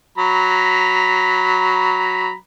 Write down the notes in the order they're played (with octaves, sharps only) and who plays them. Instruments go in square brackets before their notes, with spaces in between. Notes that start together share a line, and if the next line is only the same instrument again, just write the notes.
[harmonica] F#3 A#5 B5